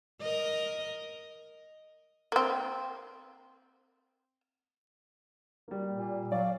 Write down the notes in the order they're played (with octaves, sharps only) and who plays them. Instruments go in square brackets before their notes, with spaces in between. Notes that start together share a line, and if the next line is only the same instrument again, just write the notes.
[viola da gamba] A#4 D#5
[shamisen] A#3 C4
[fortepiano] G3 A#3
[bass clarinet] A#2
[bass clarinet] F#3 [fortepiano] D5 [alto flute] F5